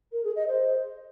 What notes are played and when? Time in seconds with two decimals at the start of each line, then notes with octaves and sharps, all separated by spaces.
0.12 A#4
0.23 G#4
0.35 D#5
0.47 C5